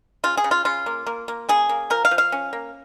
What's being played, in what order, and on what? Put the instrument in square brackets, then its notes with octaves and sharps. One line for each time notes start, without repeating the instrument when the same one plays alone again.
[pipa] C#3 F4
G#4
C#3
F4
C#3 F4
A#3
A#3
A#3
C#3 G#4
A#3
F3 A#4
F5
F3
F5
C#4
A#3